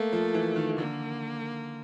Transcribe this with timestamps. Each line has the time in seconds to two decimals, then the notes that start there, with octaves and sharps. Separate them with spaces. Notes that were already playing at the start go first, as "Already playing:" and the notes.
Already playing: A3 A#3
0.13 F3
0.34 E3
0.56 D#3
0.78 D3 A#3